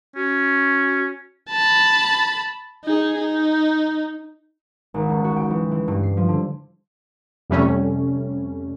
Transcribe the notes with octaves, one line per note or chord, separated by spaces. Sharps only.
C#4 F#4
A5 B5
D#4 G#4
D#4
G#1
C#2
F#4
G5
E3
E3
G2
C7
F3
D3
F2 C3 G3 A3 C#4